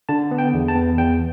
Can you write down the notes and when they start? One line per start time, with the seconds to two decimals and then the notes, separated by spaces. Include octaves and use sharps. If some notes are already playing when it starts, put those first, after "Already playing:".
0.09 D3 A5
0.31 B3
0.38 G5
0.54 E2
0.68 A5
0.75 B3
0.98 E2 G5